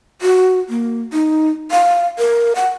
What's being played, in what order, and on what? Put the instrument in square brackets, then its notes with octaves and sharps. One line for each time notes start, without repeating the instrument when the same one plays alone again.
[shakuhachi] F#4
A#3
D#4
F5
A#4
F#5